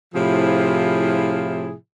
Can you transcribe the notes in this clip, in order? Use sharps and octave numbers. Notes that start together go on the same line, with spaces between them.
A2 C3 F3 E4 F4 G#4